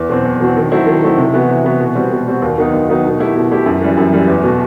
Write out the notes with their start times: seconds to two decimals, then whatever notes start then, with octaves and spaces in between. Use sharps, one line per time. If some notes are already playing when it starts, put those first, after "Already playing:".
Already playing: E2
0.09 B2 F#3 C4
0.25 E2
0.40 B2 F#3 C4
0.57 D#3
0.72 F#3 A3 C4 E4
0.86 D#3
1.03 F#3 A3 C4 E4
1.18 C3
1.33 E3 B3 F#4
1.49 C3
1.64 E3 B3 F#4
1.80 B2
1.95 G3 C4 F#4
2.11 B2
2.27 G3 C4 F#4
2.42 D#2
2.58 D#3 F#3 B3 D#4
2.73 D#2
2.89 D#3 F#3 B3 D#4
3.04 B2
3.19 A3 E4 G4
3.35 B2
3.51 A3 E4 G4
3.66 F#2
3.81 E3 G3
3.97 F#2
4.12 E3 G3
4.28 E2
4.43 B2 A3